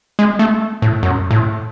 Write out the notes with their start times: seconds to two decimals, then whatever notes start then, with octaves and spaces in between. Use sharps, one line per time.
0.19 G#3
0.39 A3
0.82 A2
1.03 F#2
1.31 A2